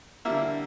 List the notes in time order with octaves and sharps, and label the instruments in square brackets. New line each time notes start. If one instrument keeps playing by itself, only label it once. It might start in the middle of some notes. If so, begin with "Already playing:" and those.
[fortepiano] D3 G3 A#3 E4